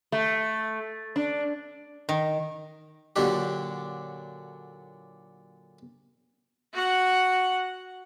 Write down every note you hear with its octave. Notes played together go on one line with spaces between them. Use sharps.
A3
D4
D#3
A#2 D3 F#3 D4 G4
F#4 F#5